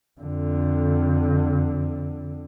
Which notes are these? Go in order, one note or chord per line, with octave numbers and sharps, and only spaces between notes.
F2 D3